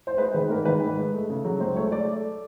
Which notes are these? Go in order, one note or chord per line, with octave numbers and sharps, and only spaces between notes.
C5
G#3 B4
D#3 B4
G#2 A#4
D#3 B4
G#2
G#3
A3
C#3
F#3
C#2 C5
A3 C#5
A3 D5